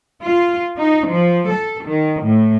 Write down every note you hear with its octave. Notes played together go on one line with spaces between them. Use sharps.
F4
D#4
F3
A4
D#3
A2